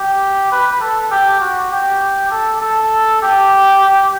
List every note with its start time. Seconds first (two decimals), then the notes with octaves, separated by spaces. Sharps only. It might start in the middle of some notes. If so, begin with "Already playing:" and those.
Already playing: G4
0.52 B4
0.81 A4
1.11 G4
1.41 F#4
1.72 G4
2.31 A4
2.61 A4
3.22 G4